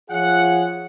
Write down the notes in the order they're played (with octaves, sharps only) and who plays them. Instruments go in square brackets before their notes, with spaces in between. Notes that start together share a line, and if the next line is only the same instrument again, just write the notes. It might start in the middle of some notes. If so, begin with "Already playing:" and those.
[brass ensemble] F3 F4 G#4 C#5 F#5